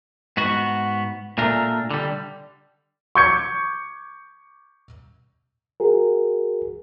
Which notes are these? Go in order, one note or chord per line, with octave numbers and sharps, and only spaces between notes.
G#2 B3 F#4
A#2 A3 D4 A#4
D3 G3
C#6 D6 G6 G#6 C#7
F#4 G#4 A#4